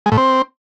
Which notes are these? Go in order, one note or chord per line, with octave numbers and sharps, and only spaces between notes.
G#3
A2
C4